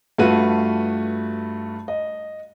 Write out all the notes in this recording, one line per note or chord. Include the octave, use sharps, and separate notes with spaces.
G2 A3 F4 F#4 B4 D#7
D#5